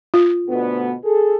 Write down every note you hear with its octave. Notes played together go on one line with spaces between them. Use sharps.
F4
D2 B2 B3
G#4 A4